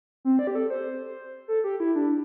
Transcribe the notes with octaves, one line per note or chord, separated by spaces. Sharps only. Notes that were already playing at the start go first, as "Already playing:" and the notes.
C4
D5
G4
A4
C5
A4
G4
E4
D4